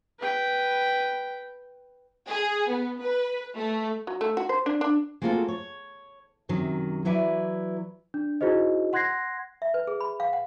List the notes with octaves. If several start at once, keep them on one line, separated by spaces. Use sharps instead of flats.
B4 G5
G#4
B3
B4
A3
F#3
A3
F#4
C5
D4
D4
G#3 A#3 C4 F4 F#4 A4
C#5
F#2 C3 D#3 F#3
E3 F#3 E4 B4 D5
D4
D#4 E4 F#4 G#4 C5 D#5
F#5 C6 F#6 G#6 A#6 C7
E5
B4
G#4
B5
F5
F#5